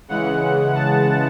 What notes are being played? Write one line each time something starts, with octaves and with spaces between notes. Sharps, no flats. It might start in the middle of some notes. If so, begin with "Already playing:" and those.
C#3 E3 G#3 F#5
A5